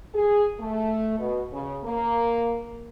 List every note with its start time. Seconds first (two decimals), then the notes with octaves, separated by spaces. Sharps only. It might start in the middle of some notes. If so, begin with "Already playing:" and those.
0.15 G#4
0.60 A3
1.19 B2
1.52 C#3
1.84 A#3